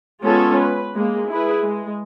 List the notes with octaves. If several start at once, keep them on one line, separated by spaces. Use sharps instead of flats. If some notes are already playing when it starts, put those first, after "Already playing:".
G#3 B3 C#4 F4 A4
B4
G#3 A#3
E4 G#4 B4
G#3